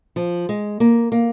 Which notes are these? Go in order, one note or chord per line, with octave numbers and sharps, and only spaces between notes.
F3
G#3
A#3
A#3